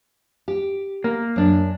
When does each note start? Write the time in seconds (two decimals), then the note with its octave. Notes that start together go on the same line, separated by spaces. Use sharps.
0.48 G4
1.04 A#3
1.36 F#2 D4